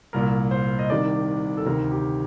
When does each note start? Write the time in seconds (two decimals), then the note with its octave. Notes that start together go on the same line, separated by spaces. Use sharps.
0.13 C2 A#2 A#4
0.51 C5
0.79 D#5
0.90 C2 C3 D#3 D5
1.57 A4
1.66 D2 C3 D#3 A#4
1.91 G4